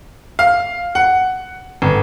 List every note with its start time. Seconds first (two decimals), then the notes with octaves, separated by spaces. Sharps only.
0.39 F5
0.95 F#5
1.82 G1